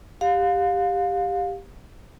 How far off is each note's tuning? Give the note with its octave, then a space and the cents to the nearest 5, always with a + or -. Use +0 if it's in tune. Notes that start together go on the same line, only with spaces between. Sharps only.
G4 +10 F5 +25